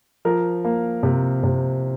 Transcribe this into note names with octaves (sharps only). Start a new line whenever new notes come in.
F3 A#4
A#3
C3
C3